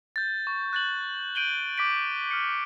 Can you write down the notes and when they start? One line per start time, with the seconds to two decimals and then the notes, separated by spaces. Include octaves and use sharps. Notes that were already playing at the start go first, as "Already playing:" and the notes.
0.16 G6 A6
0.47 C#6
0.73 F#6 A6 F#7
1.35 G6 D7 D#7 F#7 G7
1.78 D6 B6 D7
2.31 F6 C#7